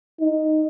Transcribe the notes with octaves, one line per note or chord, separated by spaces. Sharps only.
D#4